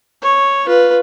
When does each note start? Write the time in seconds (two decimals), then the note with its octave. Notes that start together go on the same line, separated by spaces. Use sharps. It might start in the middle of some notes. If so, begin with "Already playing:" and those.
0.22 C#5
0.66 F4 B4